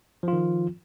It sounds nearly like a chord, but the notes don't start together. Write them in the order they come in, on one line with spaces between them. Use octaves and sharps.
F3 F4 D#3